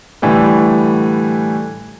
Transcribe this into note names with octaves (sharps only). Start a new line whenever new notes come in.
A2 D3 E3 G3 A3